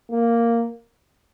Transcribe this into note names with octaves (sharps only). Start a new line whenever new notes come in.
A#3